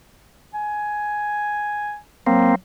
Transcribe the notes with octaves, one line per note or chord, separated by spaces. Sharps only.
G#5
F#3 A#3 C4